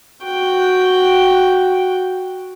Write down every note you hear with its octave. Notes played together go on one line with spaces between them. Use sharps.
F#4 G5